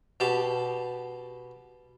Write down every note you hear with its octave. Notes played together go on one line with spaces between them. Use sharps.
B2 G4 A5